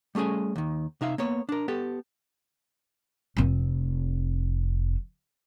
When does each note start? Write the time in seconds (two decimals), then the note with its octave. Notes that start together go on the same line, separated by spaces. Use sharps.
0.15 G3 A3 C#4 G#4 G#5
0.56 D#2 D#3
1.01 C3 D#4 E5 F5
1.18 A#3 B3 C#5
1.49 D4 A#4
1.68 B3 G4 A4
3.37 F1 C4